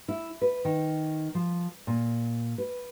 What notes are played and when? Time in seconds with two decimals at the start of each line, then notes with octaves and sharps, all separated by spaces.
0.08 E4
0.42 B4
0.65 D#3
1.35 F3
1.87 A#2
2.58 B4